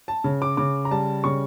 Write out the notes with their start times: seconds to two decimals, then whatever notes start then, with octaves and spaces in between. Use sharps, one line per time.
0.08 A5
0.24 C#3
0.42 D6
0.57 C#3 D6
0.85 A#5
0.91 G3 A5
1.24 C#3 C#6